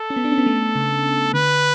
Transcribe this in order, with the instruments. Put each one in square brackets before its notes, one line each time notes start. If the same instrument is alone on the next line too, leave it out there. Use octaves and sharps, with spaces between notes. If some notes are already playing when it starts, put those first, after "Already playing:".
Already playing: [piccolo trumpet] A4
[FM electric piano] C#4
B3
D4
C#4
B3
A3
C#3
[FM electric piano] D3 [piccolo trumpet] B4